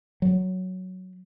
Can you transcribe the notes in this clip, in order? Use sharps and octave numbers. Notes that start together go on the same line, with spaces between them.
F#3